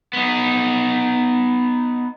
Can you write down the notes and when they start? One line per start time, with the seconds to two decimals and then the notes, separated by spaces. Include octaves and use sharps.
0.13 B3 D#4